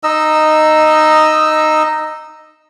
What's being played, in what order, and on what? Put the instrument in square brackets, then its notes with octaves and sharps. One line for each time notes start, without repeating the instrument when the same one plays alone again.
[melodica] D#4 D#5 E6